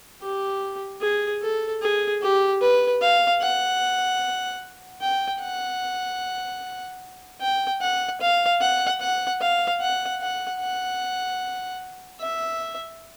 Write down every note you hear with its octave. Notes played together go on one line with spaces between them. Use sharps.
G4
G#4
A4
G#4
G4
B4
F5
F#5
G5
F#5
G5
F#5
F5
F#5
F#5
F5
F#5
F#5
F#5
E5